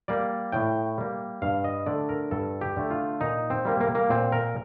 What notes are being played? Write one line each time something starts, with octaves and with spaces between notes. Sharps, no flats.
G3 A#3 D5
A2 G5
G3 A#3
G2 F5
D#5
D3 A3 D5
A#4
G2 A4
G4
D3 A3
F4
A#2 D#4
C4
G3 A#3
A#3
A#3
A#2 C4
A#4